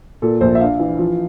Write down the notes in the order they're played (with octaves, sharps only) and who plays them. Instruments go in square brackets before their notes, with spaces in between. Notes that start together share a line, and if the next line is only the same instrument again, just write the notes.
[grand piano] A#2 A4
A#1 C5
E5
D4 F5
E3
F3